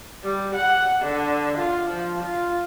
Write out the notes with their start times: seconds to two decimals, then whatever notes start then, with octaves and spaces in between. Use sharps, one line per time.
0.23 G3
0.55 F#5
1.01 D3
1.58 F4
1.88 F3
2.23 F4